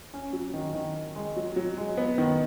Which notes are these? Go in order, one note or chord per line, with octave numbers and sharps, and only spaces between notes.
C#4
F#3
D#3
D#3
G#3
F#3
F#3
G#3
B3
D#3